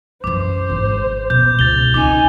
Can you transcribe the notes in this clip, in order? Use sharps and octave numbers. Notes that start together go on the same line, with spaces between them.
F#2 E3 C5 D6
G#1
B2 G6
C#2 A6 F7 G7
C#2 C4 D#4 G#5 D6